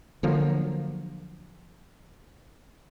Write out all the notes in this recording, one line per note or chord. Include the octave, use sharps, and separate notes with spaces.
D3 F3 F#3 A#3